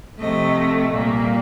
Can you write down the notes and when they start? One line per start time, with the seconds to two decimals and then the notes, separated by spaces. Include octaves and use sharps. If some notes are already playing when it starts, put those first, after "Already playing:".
0.19 C3 F3 A3 D#5
0.92 A#2 G3 A#3